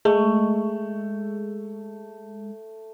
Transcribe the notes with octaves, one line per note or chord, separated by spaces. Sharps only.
G#3 A3